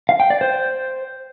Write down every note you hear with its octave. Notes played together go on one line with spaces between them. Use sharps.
F5
G5
D5
C5